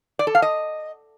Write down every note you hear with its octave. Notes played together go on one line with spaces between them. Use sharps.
D5
A4
F5
D#5